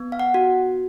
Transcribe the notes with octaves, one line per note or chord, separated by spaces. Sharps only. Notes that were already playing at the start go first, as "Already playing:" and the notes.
Already playing: B3
F5
F#5
F#4